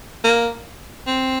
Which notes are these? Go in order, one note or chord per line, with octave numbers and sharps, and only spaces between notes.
A#3
C4